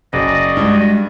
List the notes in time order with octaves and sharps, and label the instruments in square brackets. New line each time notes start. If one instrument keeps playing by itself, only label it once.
[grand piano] F#1 [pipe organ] F#4 D5 D#5
[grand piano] G2 [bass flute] G#3